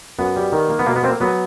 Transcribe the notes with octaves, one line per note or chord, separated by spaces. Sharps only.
F#2 B3
G3
D#3
A#3
B3
B2 A#3
B3
A#3 C4
F#3 B3